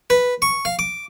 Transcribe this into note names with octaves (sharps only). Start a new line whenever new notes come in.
B4
C#6
F5
D6